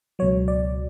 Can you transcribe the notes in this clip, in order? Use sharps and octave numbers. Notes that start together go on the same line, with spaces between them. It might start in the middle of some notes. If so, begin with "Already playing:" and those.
C#2 B2 F#3 C#5
D5